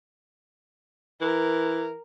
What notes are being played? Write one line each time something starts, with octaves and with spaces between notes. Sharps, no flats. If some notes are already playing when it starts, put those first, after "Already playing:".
E3 A#4